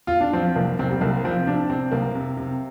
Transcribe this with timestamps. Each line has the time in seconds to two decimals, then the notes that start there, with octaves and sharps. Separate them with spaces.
0.07 F4
0.21 D4
0.33 F3 C4
0.56 C2 A#3
0.79 C2 C4
0.91 G3
1.01 C2 A#3
1.24 F3 C4
1.46 C3 D4
1.70 C3 C4
1.91 C2 A#3
2.15 C3
2.37 C3